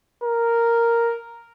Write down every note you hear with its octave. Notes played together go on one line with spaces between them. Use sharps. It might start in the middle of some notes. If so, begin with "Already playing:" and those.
A#4